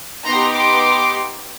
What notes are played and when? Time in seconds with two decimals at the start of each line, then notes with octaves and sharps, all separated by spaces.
0.25 B3 D#4 G4 A#5 C6
0.53 C6 D6